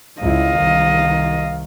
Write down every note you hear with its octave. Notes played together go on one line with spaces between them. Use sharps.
C#2 E4 D#5 F5
C2 D#3